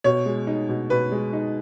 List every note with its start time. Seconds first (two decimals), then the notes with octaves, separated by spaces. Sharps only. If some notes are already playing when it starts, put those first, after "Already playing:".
0.04 B2 C#5
0.26 G#3
0.47 D#4
0.69 B2
0.90 B2 B4
1.12 G#3
1.33 D#4